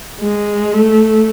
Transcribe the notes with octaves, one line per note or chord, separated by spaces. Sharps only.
G#3
A3